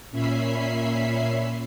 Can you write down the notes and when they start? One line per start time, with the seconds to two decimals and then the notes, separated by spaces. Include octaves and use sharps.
0.11 A#2 C#4 E5 B5 C7